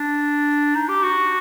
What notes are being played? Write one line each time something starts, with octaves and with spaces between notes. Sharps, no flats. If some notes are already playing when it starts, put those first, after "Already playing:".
Already playing: D4
D#4
G4
F#4